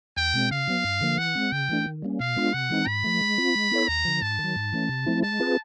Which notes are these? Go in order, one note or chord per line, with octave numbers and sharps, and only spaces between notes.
E2 G5
B2 G#3 C4
C#3 F5
F#3 B3
G2
D3 F3 A#3
E3 F#5
G#3 C4
C#3 G5
E3 A3 D4
D#3
G3 A#3 C#4
B2 F5
G#3 B3 D4 F4
C3 F#5
E3 G#3 C4 D#4
G#2 B5
F3 A3
G#3
C4 F4
G#3
B3 E4 A4 C#5
D#2 A#5
D3 F3
G#2 A5
D#3 F#3
G#2
E3 A3 C#4
C3
F3 A3 C4 E4
G#3 A5
C4 F4 G#4 B4